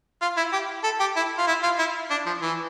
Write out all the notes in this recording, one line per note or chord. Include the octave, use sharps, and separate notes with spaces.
F4
E4
G4
A4
G4
E4
F4
E4
F4
E4
D4
F3
E3